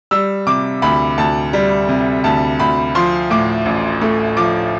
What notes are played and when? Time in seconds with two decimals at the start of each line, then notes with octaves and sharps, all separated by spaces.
0.11 G3 E6
0.47 C3 D6
0.82 D2 B5
1.18 D2 A5
1.53 G3
1.89 C3
2.24 D2 A5
2.59 D2 B5
2.95 F3 C6
3.30 A2 D6
3.66 A1
4.01 A3
4.37 F3 D6